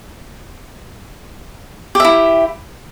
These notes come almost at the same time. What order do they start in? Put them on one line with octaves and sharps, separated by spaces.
G4 E5 E4